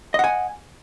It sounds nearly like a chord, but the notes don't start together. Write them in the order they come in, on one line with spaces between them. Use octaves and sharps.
D#5 F#5 G#5